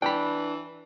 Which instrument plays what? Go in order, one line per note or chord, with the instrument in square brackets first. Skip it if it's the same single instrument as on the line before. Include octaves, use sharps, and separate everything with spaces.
[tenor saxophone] E3 [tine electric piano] D4 [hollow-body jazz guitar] G5 B5